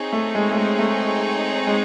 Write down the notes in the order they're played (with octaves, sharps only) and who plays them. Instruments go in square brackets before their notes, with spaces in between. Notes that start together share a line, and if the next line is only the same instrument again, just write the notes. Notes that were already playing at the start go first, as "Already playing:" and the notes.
Already playing: [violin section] C4 D#4 G#4 C#5
[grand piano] A3
G#3
A3
G#3
A3
G#3